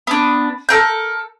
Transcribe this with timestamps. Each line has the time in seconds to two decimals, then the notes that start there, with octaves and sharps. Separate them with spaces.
0.07 B3 D4
0.69 A4 A#4 G6